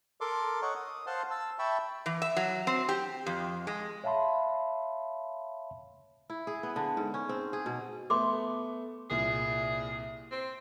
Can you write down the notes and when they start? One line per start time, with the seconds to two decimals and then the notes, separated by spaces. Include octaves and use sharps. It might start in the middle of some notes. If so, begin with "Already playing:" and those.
0.21 A4 A#4 C6 D6
0.62 C#5 D#5 F#5 C#6
0.76 D#6
1.06 C5 F5 F#5 A5 C6
1.31 A5 E6
1.59 E5 G5 A5 B5 C#6
2.06 E3
2.22 E5
2.37 F#3
2.67 C4
2.89 G4
3.26 F2
3.67 G#3
4.04 C#5 E5 F5 A5 B5 C6
6.30 E4
6.47 G#4
6.63 B3
6.76 D3
6.97 G#2
7.14 C#4
7.29 C4
7.53 G#4
7.66 B2
8.10 A3 B3 C6 D6
9.10 C2 A#2 G#4
10.31 C4